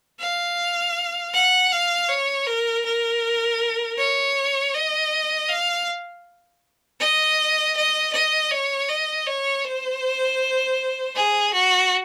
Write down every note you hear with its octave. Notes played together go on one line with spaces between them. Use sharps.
F5
F#5
F5
C#5
A#4
A#4
C#5
D#5
F5
D#5
D#5
D#5
C#5
D#5
C#5
C5
G#4
F#4